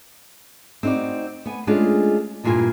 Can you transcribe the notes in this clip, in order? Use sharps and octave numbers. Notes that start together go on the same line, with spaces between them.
C4 D#4 F4 F#4 D5
B3 G#5
G#3 A3 C#4 D4 F4 G#4
E2 G2 A#2 F4 G#5